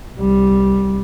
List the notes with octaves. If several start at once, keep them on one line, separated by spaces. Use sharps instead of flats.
C2 G3